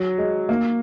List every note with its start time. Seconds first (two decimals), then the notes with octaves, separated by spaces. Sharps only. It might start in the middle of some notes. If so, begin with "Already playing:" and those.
Already playing: F#3
0.18 G#3
0.49 A#3